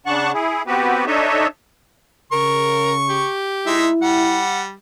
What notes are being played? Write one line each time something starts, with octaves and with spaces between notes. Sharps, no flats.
C#3 D4 F#5 A5 C#6 F#6
E4 G#4
B3 C4 F#4 G4 B4
D4 D#4 A4 C#5 D#5 E5
C#3 A#4 C#6
G4
G#3 D#4 E4 E5
G3 F#5